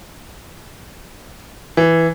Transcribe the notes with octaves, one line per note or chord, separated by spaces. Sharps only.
E3